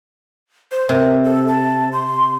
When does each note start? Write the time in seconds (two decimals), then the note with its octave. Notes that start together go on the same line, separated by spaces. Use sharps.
0.72 C5
0.89 C3 A#4
1.24 A4
1.48 A5
1.93 C6